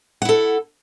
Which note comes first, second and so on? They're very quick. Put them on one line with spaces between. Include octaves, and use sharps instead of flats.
F#5 E4 A4